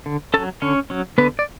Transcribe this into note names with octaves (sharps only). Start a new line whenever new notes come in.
D3
F#3 C#4 A4 A5
D3 C#4 C#5
F#3 C#4
D3 B3 B4
D5